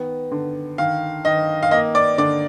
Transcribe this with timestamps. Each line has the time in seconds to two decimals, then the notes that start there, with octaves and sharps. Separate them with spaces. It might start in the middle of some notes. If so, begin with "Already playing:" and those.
Already playing: D#3 B3
0.31 D3
0.78 D#3 F5
1.25 D#3 D#5
1.63 F5
1.71 A#3 D#5
1.95 D5
2.18 D3 D5